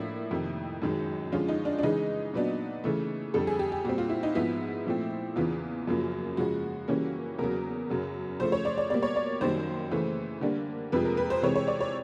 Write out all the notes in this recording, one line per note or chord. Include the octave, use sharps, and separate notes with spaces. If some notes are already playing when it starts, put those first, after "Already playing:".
Already playing: A2 F3 A#3 D4 E4
F2 C3 D#3
F#2 D#3 G#3
D3 F3 G#3 C#4 F4
D#4
D4
D4
C#3 E3 G#3 D#4
A#2 F#3 B3 D4
C#3 E3 A3
F2 D3 G3 A4
G#4
G4
G4
A#2 G3 C4 F#4
F4
E4
D#4
G#2 F3 G#3 B3 E4
A#2 F3 A3 C4
E2 C#3 E3 F4
F#2 C#3 F3 A#3
C#3 F3 G#3 F#4
C#3 E3 G3 A#3 C#4
E2 C#3 F#3 A#4
F#2 C#3 F#3
C#3 F3 A3 C5
C#5
D5
D5
B2 G3 A#3 D5
C#5
D5
F#2 D#3 G3 A#3 C5
C#3 E3 A3
D3 G3 A#3 D4
F2 C3 F3 G#3 B4
A#4
B4
C5
C3 E3 G#3 C4 C#5
C#5
D5
C#5